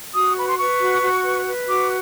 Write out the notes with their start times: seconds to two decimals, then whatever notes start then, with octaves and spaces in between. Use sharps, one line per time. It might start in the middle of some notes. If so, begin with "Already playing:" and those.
0.14 F#4 D#6
0.37 B4 B5
0.49 C6
0.58 B4 C#6
0.80 F#4
1.02 F#4
1.24 B4
1.46 B4
1.68 F#4 D6